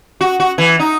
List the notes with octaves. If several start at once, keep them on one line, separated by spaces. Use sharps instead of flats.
F#4
F#4
E3
D#4